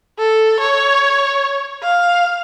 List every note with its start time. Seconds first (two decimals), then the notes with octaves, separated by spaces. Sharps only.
0.19 A4
0.60 C#5
1.83 F5